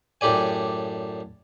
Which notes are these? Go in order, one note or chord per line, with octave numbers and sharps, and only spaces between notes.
F#2 A2 G4 D5 G#5